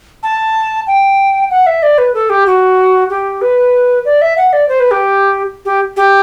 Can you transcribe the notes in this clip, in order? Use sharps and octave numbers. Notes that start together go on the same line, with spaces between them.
A5
G5
F#5
E5
D5
B4
A4
G4
F#4
G4
B4
D5
E5
F#5
D5
C5
B4
G4
G4
G4